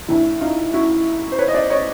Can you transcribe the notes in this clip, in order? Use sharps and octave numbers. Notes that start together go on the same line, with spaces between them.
A2 E3 D4 E4
D#4 F4
E4 F#4
C5
B4 C#5
D#5
C5 D5
C#5 D#5